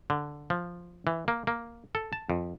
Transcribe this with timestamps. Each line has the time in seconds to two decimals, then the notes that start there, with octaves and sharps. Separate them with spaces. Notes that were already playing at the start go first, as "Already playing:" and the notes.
0.10 D3
0.50 F3
1.07 E3
1.28 A#3
1.47 A#3
1.95 A4
2.13 A5
2.30 F2